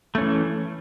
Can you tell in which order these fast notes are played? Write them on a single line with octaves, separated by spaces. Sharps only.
A3 C#4 E3